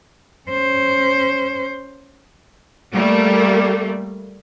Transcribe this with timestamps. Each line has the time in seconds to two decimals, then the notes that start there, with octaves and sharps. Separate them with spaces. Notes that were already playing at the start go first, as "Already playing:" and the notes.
0.50 C#4 C5
2.93 G3 A3 A#3